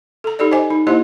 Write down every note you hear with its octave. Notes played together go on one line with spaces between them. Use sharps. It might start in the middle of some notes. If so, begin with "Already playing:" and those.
A4 A#5
D#4 G4 A4 D5
C5 D#5 G#5
D#4
A#3 E4 G4 C5 D#5 C6